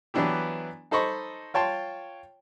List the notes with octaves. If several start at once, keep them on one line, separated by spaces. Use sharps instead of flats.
E3 F#3 B3 D4 E4 G4
D#4 A4 C5 D#5 B5 C#6
F4 C#5 G5 A5 C6